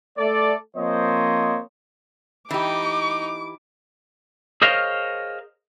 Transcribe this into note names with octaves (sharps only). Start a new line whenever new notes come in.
A3 A4 D5
F3 A#3 C4 C5 C#5 D#5
E3 D#4 G4 D6
G#4 A#4 C5 C#5 D#5 F5